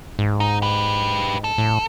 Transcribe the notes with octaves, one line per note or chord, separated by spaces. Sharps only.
G#2
D#4
G4 B4
A4
A2